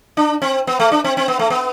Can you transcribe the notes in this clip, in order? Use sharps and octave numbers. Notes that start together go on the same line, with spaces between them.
D4
C4
B3
A3
D4
C4
C4
B3
A3
B3